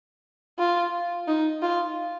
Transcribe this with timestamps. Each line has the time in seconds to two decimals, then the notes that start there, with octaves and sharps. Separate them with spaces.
0.59 F4
1.28 D#4
1.62 F4